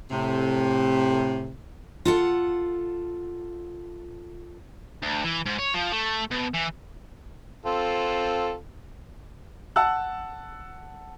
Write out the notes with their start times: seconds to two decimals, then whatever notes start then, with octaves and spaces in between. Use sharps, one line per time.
0.10 A2 C3
2.05 F4 A4 F#5
5.03 D2
5.25 E3
5.46 G#2
5.59 C#5
5.74 F3
5.92 A3
6.31 B2
6.54 E3
7.65 C4 F4 A4
9.76 F#5 A5 E6 F#6